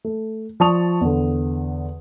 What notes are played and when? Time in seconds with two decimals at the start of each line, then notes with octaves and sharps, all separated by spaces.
0.05 A3
0.60 F3 D5 A5 C#6 D#6 F7
1.01 E2 D3